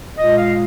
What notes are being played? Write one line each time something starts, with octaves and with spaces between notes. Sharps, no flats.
A#2 G#3 F4 D#5
F5